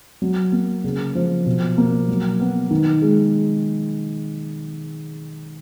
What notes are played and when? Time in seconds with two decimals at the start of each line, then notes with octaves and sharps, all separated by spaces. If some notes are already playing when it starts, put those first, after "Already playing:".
0.22 F#3
0.52 A#3
0.84 C#3
1.15 F3
1.46 B2
1.77 A#3
2.08 F#3
2.40 B3
2.71 D#3
3.02 G#3